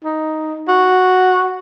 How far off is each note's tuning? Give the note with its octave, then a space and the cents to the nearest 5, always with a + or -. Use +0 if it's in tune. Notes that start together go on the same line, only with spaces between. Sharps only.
D#4 +5
F#4 -5